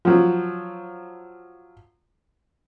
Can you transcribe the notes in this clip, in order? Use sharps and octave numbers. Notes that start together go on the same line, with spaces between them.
F3 F#3